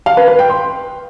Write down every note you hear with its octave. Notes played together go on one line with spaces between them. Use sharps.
F5
B4
B4
G5
C6